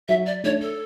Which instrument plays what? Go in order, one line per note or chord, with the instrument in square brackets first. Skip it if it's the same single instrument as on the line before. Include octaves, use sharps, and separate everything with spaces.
[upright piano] F#3 [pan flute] E5
[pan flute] D5
[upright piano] A3 D4 [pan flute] C#5
[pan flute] A4